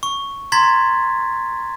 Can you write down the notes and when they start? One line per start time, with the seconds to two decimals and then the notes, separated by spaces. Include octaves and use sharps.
0.03 C#6
0.52 A#5 C6 G#6 A6 B6